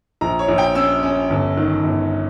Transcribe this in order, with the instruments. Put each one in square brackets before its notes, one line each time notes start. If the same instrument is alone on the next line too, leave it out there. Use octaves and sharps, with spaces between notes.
[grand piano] A#1 A#5
C#5
A#1
G5
C#4 E6
C#4
G1
D#3
G1